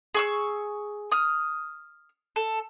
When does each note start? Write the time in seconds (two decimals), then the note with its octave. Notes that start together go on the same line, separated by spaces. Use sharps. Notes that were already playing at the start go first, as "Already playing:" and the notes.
0.14 G#4 C#6 E6
1.12 D#6 F6
2.36 A4